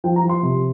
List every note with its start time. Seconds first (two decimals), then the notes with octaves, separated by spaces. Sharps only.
0.04 F3 G5
0.16 A#5
0.23 F3
0.29 C6
0.43 C3